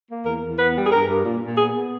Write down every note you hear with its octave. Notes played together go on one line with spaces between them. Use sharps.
A#3
E2 A#4
E2
B3 B4
G3
G#4
G2 A#4
G2
A#2
A#2
B3 G#4
B3